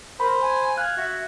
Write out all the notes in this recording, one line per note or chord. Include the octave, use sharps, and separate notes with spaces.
A#4 C5 B5
G#5
F5 F#6 G#6
F#4 E5